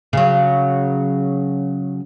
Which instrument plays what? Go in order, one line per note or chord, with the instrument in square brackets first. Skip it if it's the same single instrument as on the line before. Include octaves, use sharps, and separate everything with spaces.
[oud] C#3 F#3